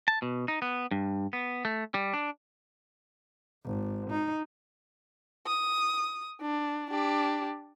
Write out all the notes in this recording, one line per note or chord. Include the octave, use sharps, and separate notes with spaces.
A5
B2
D#4
B3
G2
B3
A3
G3
D4
G#1
D#4
D#6
D4
D4 G4